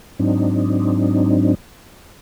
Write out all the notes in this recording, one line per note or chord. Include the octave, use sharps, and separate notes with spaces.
G#2 F#3 C4 D4 D#4